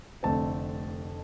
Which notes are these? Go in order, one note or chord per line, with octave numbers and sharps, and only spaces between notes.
F1 F2 D3 A3 C4 A5